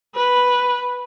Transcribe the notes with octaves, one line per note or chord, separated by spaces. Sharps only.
B4